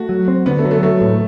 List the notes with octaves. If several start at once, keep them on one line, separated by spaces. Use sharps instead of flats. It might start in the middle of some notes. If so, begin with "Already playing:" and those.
Already playing: A3 F#4
F#3
C4
D3 B3
A3
F#3
A3
F#3 A3
A2